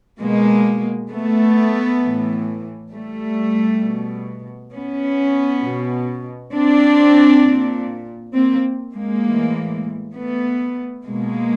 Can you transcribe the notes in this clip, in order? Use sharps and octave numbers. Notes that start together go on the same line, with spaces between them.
B2 G#3 A#3
A3 B3
A2 E3
G3 A3
B2
B3 C#4
B2
C4 D4
A#2
A#3 C4
G#3 A#3
A2 E3
A3 B3
B2 G#3 A#3